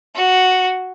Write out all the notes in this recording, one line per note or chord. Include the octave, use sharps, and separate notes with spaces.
F#4